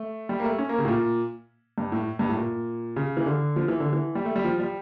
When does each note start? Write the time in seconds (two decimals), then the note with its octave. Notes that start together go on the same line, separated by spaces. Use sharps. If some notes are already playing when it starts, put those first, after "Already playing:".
Already playing: A3
0.29 G3
0.40 A#3
0.44 A3
0.58 C#4
0.69 A#3
0.78 C#3
0.85 A2
0.88 A#2
1.78 G2
1.92 A2
2.19 G2
2.29 A2
2.37 A#2
2.96 C#3
3.17 E3
3.26 D3
3.56 F3
3.68 E3
3.80 D3
3.93 E3
4.15 G3
4.25 A3
4.36 G3
4.45 F3
4.60 G3